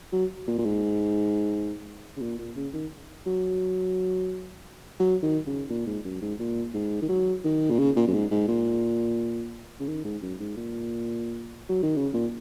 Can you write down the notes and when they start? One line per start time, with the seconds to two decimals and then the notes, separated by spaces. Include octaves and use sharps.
0.13 F#3
0.47 A#2
0.58 A#2
0.65 G#2
2.17 C#3
2.21 A#2
2.39 A#2
2.56 C#3
2.74 D#3
3.26 F#3
5.00 F#3
5.23 D#3
5.47 C#3
5.70 A#2
5.87 G#2
6.05 F#2
6.22 G#2
6.39 A#2
6.74 G#2
7.02 D#3
7.09 F#3
7.44 D#3
7.71 A#2
7.79 C#3
7.96 A#2
8.07 F#2
8.13 G#2
8.31 G#2
8.48 A#2
9.80 C#3
9.88 D#3
10.05 G#2
10.22 F#2
10.40 G#2
10.57 A#2
11.69 F#3
11.83 D#3
11.96 C#3
12.14 A#2